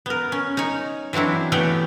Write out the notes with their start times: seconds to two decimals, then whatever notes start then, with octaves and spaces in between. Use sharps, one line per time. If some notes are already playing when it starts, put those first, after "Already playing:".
0.06 B3 A#4
0.32 C#4
0.57 D#4 C#5
1.13 E3 F#3 C4 D4 E4
1.52 E3 A3 B3 G4 C#5 G5